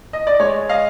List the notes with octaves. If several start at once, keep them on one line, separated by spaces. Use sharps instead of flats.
D#5
D5
G#3 C#5
D#5 F5